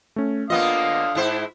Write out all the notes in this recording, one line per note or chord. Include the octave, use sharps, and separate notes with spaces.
A3 C#4
D3 A#3 B3 F4 D#5 F5 D#6
G#2 E4 C5